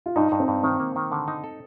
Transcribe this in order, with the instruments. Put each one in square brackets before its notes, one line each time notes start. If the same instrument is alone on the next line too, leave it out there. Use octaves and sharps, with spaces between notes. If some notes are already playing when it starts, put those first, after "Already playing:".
[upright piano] F4
[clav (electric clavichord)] G2 [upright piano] D#4
[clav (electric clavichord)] G2
[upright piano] C4
[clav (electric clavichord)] G2
[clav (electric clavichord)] D#3 [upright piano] C4
[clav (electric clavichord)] A#3
D#3
D3
D#4
A4